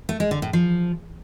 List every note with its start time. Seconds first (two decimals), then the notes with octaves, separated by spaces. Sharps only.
0.09 A3
0.20 G#3
0.31 D3
0.42 A2
0.53 F3